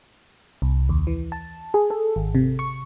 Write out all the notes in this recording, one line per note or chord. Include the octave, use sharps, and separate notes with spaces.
C2
D#2
E3
A5
G#4
A4
G#1
C3
C#6